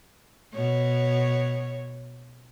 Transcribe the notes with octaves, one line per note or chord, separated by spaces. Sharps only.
B2 C#5